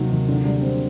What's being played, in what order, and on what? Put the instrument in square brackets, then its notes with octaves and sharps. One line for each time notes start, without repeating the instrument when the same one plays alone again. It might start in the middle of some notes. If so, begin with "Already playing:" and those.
Already playing: [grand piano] D#2 D#3 F#3 [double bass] C3
[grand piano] D#2
D3
G3
C4